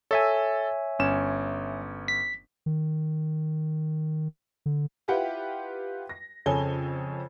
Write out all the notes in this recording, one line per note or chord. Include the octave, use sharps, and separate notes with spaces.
A4 C#5 E5 G#5
G1 C#4 E7
B6
D#3
D3
E4 F4 G4 B4 F#5 G5
A#6
F2 C#3 A4 C#5 G#5 G7